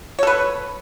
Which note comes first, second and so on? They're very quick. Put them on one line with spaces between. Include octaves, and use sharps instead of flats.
C#5 A4 B4